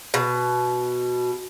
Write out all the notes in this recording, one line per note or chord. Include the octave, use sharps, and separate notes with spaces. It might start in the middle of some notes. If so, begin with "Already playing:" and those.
B2